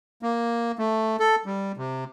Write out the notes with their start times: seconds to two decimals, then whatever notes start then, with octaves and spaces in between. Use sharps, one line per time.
0.22 A#3
0.79 A3
1.20 A4
1.46 G3
1.77 C3